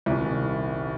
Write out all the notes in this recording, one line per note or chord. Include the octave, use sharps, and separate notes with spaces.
D#1 C2